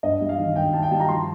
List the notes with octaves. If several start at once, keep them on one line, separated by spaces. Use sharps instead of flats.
G2 D#5
G3
F5
D#3
G2 G5
G2 A5
G5
G3 A5
A#5
F3 C6